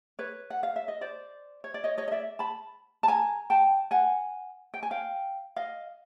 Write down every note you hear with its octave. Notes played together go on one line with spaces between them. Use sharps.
B4 C#5
F#5
F5
E5
D#5
C5 D5
C#5
D5
C#5 D#5
C#5 D#5
D#5
D5 E5
A5 B5
A5
G#5 A#5
G5 A5
F#5 G#5
G5
G#5
F5 G5
D#5 F5